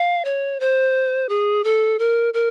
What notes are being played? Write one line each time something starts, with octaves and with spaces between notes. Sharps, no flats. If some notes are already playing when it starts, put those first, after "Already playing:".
Already playing: F5
C#5
C5
G#4
A4
A#4
A#4